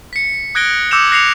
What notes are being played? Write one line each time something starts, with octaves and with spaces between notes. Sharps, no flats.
B6 C#7
D#6 F#6 G#6 A#6 D7 G7
D6 E6 G6 C#7 E7 F7
F#6 A#6 C7 C#7 F7